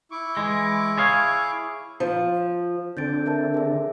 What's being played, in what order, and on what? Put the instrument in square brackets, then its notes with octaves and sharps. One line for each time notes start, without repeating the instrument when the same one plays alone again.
[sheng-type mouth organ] E4 C#6 D6
[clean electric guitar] E3 G#3
G#4 C#5 F5
[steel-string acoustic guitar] F3
[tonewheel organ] D3 C4 D4 [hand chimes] G6 A6 D7
[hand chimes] A#4 E5 A5
G#4 E5